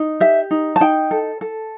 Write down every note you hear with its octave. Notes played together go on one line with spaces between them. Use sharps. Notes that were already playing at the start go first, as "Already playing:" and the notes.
Already playing: D#4
G4 E5
D#4
A5
D#4 G5
A4
A4